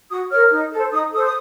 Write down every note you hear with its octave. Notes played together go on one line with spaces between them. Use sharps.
F#4 D#6
A#4 C#5 F6
D#4
A4 C5
D#4 D#6
A4 C5 D#6
D#6